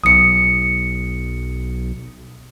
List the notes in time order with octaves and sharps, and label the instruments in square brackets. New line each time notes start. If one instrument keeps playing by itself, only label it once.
[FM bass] B1 [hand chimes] D#6 C#7